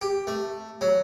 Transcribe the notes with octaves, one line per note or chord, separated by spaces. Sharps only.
G4
A3
F#3